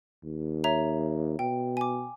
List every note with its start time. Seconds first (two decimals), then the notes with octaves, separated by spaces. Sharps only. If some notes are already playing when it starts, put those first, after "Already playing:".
0.24 D#2
0.64 C#5 E5 A#5
1.39 B2 G5
1.77 G#5 D6